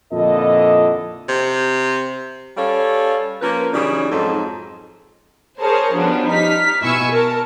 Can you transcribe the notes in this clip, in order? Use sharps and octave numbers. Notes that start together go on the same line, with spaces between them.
F2 A#2 D3 E4 A4 D#5
C3
G3 C#4 A4 C#5 F5
F3 A#3 C#4 A#4 B4
C#3 E3 F#3 G3 D4 D#4
F2 G#2 F#3 D#4 A4
G#4 A#4 C5 C#5 A5 A#5
F3 G3 B3 C#4 D4 F#4
D#4 G4 F6 B6
B2 E4 G#5 C#6 E6
A#4 A5